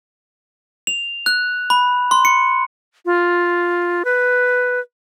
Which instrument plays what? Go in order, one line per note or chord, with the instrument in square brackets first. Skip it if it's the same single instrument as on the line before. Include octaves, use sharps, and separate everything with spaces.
[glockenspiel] F7
F#6
B5
C6
C#7
[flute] F4
B4